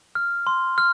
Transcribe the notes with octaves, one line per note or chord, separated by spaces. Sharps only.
F6
C6
F6